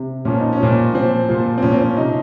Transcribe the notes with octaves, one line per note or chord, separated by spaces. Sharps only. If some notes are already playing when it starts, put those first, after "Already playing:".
Already playing: C3
A#2 F3 C#4
D#4
C#4
A#2 F3
A#2 F3 C4
A#2 F3
C4
A#2 F3 C#4
C4
C#4
C3 F3 D#4